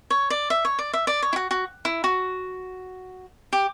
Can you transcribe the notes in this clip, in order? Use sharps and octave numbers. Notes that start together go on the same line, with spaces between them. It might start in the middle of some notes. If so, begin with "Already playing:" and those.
C#5
D5
E5
C#5
D5
E5
D5
C#5
E4
F#4
F#4
E4
F#4
G4